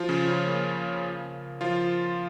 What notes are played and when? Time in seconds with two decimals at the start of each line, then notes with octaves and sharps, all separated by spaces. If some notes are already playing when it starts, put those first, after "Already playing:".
Already playing: F3 F4
0.09 C#3 C#4
0.27 F3 F4
0.47 A#3
1.61 F3 F4